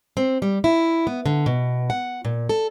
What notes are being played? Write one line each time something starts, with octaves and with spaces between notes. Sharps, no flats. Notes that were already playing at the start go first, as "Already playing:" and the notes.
C4
G3
E4
B3
D3
B2
F#5
A#2
A4